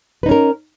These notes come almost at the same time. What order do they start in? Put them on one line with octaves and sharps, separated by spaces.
B4 D#4 C#4 A#4